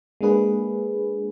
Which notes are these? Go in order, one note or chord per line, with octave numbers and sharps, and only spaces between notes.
G#3 A#3 D4 G#4 B4